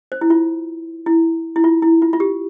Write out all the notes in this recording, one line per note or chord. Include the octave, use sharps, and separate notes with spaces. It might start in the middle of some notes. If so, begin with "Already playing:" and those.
C5
E4
F4
E4
E4
F4
E4
F4
F4
G4